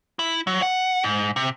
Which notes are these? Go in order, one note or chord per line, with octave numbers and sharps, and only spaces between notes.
E4
F#3
F#5
G#2
C3